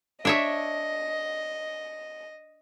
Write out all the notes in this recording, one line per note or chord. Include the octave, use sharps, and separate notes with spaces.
D4 C#5 D#5 E5